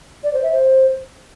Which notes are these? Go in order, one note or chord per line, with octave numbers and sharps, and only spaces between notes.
D5
C5
E5
C5